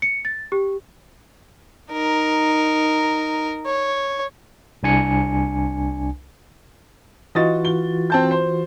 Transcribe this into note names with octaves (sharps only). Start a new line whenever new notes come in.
C#7
A6
G4
D#4 A#4
C#5
C2 D4 G#5 C#7
E3 F4 F#4 D#5 A6
G7
C4 A5 G6
C5